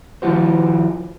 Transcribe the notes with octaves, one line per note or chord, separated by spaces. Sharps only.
D#3 F3 E4 F#4 C5